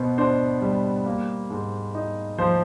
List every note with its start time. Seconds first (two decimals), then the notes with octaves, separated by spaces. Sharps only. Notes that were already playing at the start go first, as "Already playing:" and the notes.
Already playing: B2 B3 C5
0.18 D4 C5
0.62 G3
1.06 A#3
1.50 G#2
1.95 D#4
2.38 F3 C5